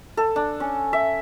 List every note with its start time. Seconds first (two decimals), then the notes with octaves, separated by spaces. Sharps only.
0.17 A4
0.36 D4
0.60 C#4
0.93 E5